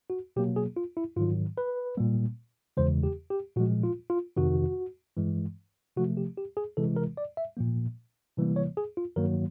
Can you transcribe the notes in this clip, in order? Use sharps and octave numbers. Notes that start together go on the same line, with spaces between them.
F#4
B2 F#3 A#3 G4
G#4
F4
E4
G#2 D#3 F#3 F4
B4
A#2 G3 A#3
E2 C#3 E3 G#3 C5
G4
G4
A#2 F3 G#3 F#4
F4
F4
F2 C3 D#3 F#4
G2 E3 G#3
C3 F3 A3 F#4
G4
G4
G#4
C3 E3 G#3 A4
A#4
D5
E5
A#2 F3 A#3
C3 E3 G3 A#3
C#5
G#4
F4
G2 D#3 F#3 A#3 A#4